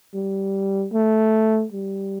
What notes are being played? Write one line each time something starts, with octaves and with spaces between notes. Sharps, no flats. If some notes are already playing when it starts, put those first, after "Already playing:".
G3
A3
G3